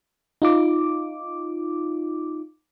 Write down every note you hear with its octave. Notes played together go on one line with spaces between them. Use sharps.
D#4 F4 D6